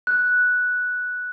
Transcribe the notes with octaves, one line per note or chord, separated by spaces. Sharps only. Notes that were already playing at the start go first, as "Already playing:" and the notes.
F#6